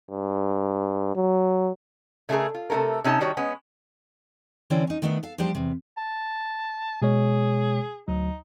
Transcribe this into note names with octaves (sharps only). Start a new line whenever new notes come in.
G2
F#3
C#3 A3 C#4 D#4 G#4 A#4
F4
C3 A3 F4 A4 A#4
C3 C#4 D#4 G#4 A5
D#3 G3 F#4 C#5
G#3 B3 C#4
D3 E3 C4 C#4 E4 D5
C#4 D#4
D3 D#3 A3 B3 D4 D#4
A4 F5
F3 G3 A#3 D4 G4 C5
E2 C3
A5
B2 G#3 G#4 C#5
D2 F#3 D#4